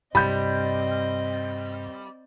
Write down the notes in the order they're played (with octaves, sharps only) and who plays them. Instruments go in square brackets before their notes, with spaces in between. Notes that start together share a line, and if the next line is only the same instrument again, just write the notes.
[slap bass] G2 C3 [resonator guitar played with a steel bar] G3 [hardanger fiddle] C4 D#5 [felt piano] B5 G6